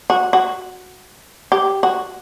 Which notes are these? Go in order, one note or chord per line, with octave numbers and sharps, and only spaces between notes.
F#4
F#4
G4
F#4